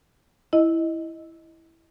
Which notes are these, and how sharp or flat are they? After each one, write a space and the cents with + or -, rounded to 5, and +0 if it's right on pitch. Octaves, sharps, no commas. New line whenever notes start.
E4 +0 D#5 +5